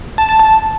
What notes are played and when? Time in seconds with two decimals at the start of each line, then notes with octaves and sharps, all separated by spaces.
0.18 A5
0.29 A5
0.39 A5